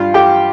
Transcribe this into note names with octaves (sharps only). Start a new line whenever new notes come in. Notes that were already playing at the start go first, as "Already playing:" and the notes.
Already playing: G2 F4 F5
G4 G5